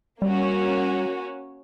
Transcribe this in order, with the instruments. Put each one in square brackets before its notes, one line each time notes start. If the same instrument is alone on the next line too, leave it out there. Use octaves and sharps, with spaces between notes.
[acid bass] G3 [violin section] A#3 C#4 F#4